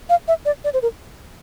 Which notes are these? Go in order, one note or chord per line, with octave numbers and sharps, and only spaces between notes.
F5
E5
D5
D5
C5
A#4